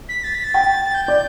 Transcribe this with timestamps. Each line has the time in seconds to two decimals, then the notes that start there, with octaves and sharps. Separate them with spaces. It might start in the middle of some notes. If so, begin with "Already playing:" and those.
0.09 B6
0.24 A6
0.35 B6
0.44 A6
0.54 G5
0.85 A6
0.94 G6
1.05 D5 G6